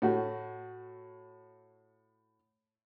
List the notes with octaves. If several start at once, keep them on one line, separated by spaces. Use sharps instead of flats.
A2 F#4